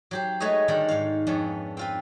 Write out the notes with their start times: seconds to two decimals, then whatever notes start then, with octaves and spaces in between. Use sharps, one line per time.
0.11 F#3 G4 C5
0.40 G#3 A3 G#4 B4 C#5 D#5
0.68 D3 D#3 G3 D#4 D5 F#5
0.88 G#2 F5
1.27 F2 B3 C#4 D4
1.77 C4 F4 B4